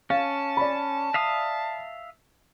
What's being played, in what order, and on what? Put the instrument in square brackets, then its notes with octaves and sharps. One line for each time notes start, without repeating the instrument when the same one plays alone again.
[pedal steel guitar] C#4 [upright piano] F5 [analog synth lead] A5
[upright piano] D5 B5
[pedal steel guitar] E5 F5 D#6